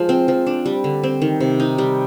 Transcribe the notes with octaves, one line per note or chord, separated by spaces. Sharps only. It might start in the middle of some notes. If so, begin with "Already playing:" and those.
Already playing: F3 G#3
C4
F3
D4
G3
D3
C4
D#3
C3
D#4
G3